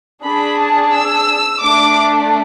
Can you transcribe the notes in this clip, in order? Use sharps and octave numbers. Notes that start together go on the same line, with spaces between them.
D4 G#4 B5
A5
E6
A3 D4 D6